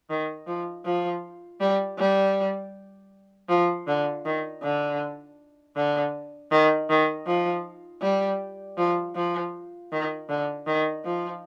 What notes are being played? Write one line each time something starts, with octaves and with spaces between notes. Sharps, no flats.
D#3
F3
F3
G3
G3
F3
D3
D#3
D3
D3
D#3
D#3
F3
G3
F3
F3
D#3
D3
D#3
F3